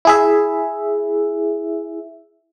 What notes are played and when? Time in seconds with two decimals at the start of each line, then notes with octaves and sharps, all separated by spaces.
0.05 E4 G#4 E5